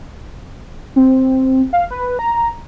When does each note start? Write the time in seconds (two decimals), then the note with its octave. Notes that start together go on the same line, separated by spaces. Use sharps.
0.96 C4
1.73 F5
1.91 B4
2.19 A#5